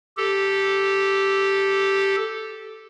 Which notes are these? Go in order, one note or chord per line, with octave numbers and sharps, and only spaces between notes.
G4 A4